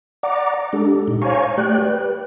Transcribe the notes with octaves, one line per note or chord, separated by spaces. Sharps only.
D5 F#5 A#5 D6
G#3 D4 G4 A4
A#2 D#4
C5 C#5 F5 G#5 A#5 C#6
A3 G4 D5 G5 F#6
B4